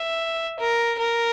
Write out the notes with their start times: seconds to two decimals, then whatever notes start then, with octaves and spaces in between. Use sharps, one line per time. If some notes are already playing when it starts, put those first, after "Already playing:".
Already playing: E5
0.59 A#4
0.98 A#4